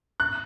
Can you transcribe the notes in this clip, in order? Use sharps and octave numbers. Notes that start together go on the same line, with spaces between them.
F#6